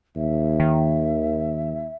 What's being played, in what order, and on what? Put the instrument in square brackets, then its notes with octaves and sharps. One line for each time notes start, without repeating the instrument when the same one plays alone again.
[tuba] D#2 [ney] E5
[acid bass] D#3